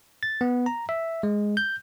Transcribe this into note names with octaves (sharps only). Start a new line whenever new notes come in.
A6
B3
A#5
E5
G#3
G6